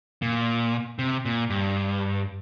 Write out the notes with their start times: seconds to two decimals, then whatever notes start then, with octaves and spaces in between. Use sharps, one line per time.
0.22 A#2
0.99 C3
1.25 A#2
1.50 G2